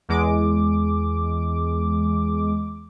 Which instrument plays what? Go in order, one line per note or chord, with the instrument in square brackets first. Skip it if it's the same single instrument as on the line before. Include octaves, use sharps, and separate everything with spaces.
[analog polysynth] E2 G#3 D6